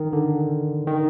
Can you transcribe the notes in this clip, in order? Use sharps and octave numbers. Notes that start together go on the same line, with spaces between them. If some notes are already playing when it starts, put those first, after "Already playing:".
Already playing: D#3
D3
D#3